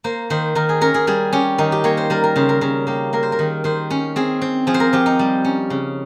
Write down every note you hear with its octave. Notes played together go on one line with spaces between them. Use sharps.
A#3 C5
D#3 C5
D#3 A#4
G#4
C#4 A#4
G#4
G3 G#4
C#4 G4
D#3 D#4
G4
A#3 C#5
C5
G3 A#4
A#4
C#3 C5
A#4
C#3 A#4
A#3 G4
A#3 A#4
C5
A#4
D#3
D#3 C5
C#4
C4 G#4
C4
F3 G#4
C5
A#4
F3 G4
D#4
G3
C#4
C#3